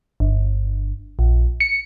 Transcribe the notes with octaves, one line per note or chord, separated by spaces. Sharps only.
G1
A#1
C#7